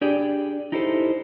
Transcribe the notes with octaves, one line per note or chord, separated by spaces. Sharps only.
D4 G4 G#4 D5 G5
D#4 E4 G4 A4 B4 C5